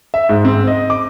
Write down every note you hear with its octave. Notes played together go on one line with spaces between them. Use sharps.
E5
G#2
C4
D#5
D6